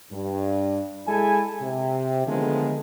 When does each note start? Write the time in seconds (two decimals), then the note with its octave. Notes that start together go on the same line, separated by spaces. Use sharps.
0.11 G2
1.07 G#3 E4 A4 G#5
1.60 C3
2.26 D3 D#3 F3 G#3 A3 B3